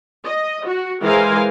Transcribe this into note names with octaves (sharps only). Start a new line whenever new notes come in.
D#5
F#4
E3 G#3 A#4 C5 F5 G#5